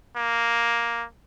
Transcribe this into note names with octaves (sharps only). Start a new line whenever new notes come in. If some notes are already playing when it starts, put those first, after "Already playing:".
A#3